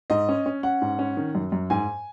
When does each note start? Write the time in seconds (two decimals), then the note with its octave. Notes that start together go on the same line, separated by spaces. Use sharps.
0.10 G#2 D#5
0.29 C#4
0.46 C#4
0.63 C#4 F#5
0.82 G#2
0.99 C#4
1.17 D#3
1.35 F#2
1.52 F#2
1.70 G#2 G#5